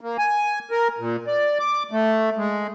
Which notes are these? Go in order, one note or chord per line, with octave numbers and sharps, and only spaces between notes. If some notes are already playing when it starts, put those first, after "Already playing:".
A#3
G#5
A#4
A#2
D5
D6
A3
G#3